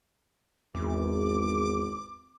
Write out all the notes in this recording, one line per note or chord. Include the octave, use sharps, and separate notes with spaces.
G#1 E2 D6